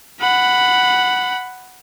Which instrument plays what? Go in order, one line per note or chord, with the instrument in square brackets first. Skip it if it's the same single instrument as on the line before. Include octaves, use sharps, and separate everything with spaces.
[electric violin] F#5 B5